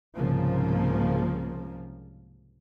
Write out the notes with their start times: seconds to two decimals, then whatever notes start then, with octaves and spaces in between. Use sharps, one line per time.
0.17 C2 G#2 C#3 F3 A#3